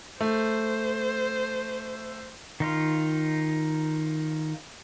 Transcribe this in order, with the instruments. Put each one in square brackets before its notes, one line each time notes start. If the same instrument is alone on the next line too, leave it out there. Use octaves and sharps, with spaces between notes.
[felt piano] A3 [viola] C5
[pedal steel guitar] D#3 D#4 F4